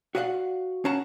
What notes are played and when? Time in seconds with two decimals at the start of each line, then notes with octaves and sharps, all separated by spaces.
0.15 F#4 D5 D#5 F5 F#5
0.85 C#4 F5 F#5 A5 A#5